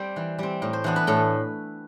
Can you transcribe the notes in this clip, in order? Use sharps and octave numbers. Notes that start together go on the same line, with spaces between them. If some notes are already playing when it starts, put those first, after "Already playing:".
Already playing: G3 C4 C5 D5
E3
G3 C4
A2
C5
E3 B3 D4
B4
A2 A4